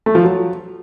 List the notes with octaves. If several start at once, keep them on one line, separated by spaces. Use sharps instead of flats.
A3
F3
F#3